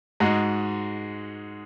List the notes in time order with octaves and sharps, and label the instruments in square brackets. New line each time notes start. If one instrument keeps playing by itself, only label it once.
[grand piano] G#2 G#3 F#4